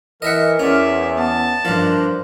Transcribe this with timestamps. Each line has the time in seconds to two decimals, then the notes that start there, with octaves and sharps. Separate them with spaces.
0.22 E3 A#4 D#5 E5 F#5
0.59 E2 C#4 D5 E5
1.17 B3 A5
1.65 G2 F3 D4 A#4 C5